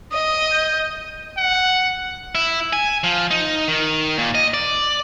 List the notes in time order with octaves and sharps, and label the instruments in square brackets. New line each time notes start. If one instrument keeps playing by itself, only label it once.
[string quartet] D#5 [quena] D#6
[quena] G6
[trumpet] F#5
[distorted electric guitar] E4
G#5
F3
D#4
D#3
A#2
D#5
D5